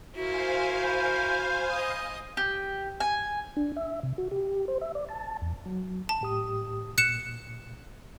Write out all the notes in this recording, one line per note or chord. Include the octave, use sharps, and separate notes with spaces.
E4 F#4 A#4 C5 F5 G#5
B5 G6
D#5 D#6
G4
G#5
D4
E5
C3
F#4
G4
C5
E5
D5
A5
E2
F#3
A5
A2 G4 D#6
A#2 F#6 C#7 E7